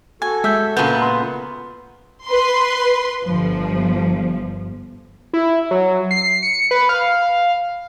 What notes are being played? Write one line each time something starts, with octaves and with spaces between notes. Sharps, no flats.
F#4 A4 G#5
G#3 E5 E6 G6
A#2 C#3 B3 A5 G6
C6
B4 C6
G1 F3
E4
F#3
C7
C#7
B4
F5